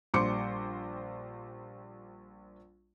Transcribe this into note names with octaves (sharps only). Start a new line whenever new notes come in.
A#1 G3 C5 C6 D6 C#7